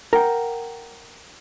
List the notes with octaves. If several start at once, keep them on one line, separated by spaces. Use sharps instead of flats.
A#4 F#5 G5